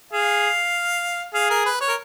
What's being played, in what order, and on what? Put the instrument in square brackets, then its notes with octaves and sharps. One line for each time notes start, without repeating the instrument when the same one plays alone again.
[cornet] G#4 [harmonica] F5
[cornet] G#4 [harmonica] F5
[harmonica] A#4
B4
C#5
A#4